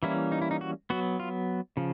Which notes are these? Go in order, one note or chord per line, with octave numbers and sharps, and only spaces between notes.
E3 G3 A#3 C#4 E4
D#4
E4
D#4
F#4
F#3 B3 F#4
F4
C#3 F3